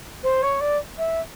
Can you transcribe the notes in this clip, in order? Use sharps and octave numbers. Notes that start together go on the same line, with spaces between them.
C5
C#5
D5
E5